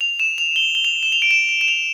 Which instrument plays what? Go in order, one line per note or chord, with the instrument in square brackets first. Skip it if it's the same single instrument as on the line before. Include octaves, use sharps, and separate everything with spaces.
[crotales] F7
E7
F7
G7
G7
F7
E7
F7
D7
E7
D7
E7
F7